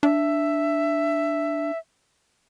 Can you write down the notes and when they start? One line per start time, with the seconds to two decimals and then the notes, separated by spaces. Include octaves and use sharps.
0.03 D4 E5